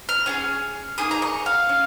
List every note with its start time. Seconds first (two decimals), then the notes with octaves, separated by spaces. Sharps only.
0.09 F6
0.26 C#4 F4 G#4
0.98 A#3 D#4 G#4 D#6
1.11 A#5
1.22 C#6
1.46 F5
1.69 C#4